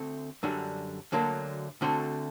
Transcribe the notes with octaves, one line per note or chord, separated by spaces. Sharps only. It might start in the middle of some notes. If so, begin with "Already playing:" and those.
Already playing: D2 D3 A3 C4
F#2 D3 G3 D4 F#4
D2 D3 F#3 A#3 D4
D2 D3 A3 C4 F#4